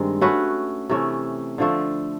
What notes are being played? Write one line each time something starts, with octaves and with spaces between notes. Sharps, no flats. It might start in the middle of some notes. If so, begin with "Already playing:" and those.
Already playing: G2 D#3 G#3 C4
A3 C#4 F#4 B4
C3 E3 A3 C#4
D3 F3 A3